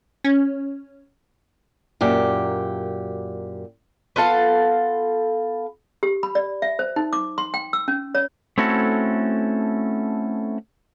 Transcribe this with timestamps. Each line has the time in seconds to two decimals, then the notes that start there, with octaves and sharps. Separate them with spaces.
0.24 C#4
2.01 F#2 A#2 G4
4.16 B3 F4 A4 F5
6.03 G4
6.23 B5
6.35 D5
6.62 E5
6.79 C5
6.96 D#4
7.13 D6
7.38 C6
7.54 G5
7.73 E6
7.88 C#4
8.15 C#5
8.58 A3 C4 C#4 E4 F#4 A4